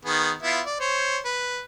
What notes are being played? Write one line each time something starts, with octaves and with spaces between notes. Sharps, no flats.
D#3 B3 G#4
B3 E4 F4
D5
C5 C#5
B4